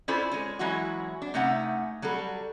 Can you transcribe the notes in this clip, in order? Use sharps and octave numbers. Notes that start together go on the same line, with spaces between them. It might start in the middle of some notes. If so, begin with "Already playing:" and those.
C#4 E4 F4 A4 C5 D5
G#3 C#4
E3 F#3 G#3 C#4 E4 F#4
D4
C3 A3 C#4 D#4 F#5
F#3 G3 F#4 A4